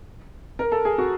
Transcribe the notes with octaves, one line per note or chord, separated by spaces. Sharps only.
A#4
A4
G#4
F#4